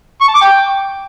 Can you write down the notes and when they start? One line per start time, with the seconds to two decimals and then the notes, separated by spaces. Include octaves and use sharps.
0.21 C#6
0.28 A5
0.34 D6
0.41 G5